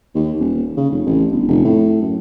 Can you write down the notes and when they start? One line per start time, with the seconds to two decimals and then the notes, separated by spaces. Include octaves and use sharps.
0.15 D#2
0.40 D#1
0.77 C#3
0.90 F1
1.06 A1
1.32 G1
1.48 F1
1.65 A2
2.02 F#2